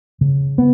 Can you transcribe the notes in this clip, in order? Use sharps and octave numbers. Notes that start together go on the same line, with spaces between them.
C#3
B3